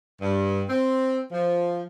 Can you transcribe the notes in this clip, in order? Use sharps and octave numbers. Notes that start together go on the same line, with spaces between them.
G2
C4
F3